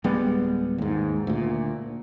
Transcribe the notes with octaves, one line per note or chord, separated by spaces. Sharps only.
D1 G3 G#3 B3
D#2 G#2
D2 A#2